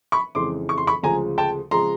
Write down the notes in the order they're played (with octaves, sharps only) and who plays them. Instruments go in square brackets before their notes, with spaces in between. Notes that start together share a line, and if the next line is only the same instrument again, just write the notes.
[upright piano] B5 C#6
F2 C#3 E3 G#3 C6 D6
C#6
C6
B5 C#6
D2 C#3 F3 G#3 G#5 A#5
G5 A5
C#3 F3 G#3 A#5 C6